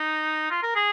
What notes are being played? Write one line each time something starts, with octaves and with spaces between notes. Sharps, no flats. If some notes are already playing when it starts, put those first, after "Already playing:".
Already playing: D#4
F4
A#4
G#4